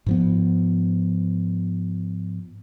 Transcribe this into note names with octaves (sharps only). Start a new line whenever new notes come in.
G#2 F3 B3